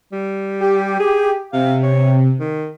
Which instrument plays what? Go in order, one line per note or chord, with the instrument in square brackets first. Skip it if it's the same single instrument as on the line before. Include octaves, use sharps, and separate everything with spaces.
[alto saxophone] G3
[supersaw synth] G4
[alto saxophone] G#4
[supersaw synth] C3 [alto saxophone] F5
[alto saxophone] C#5
D#3